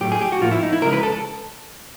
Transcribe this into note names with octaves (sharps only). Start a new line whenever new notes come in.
A2 F#3 A3 G4
G#4
G4
F#4
A2 F3 A#3 F4
E4
D#4
E4
C#3 F3 G#3 A#4
B4
A4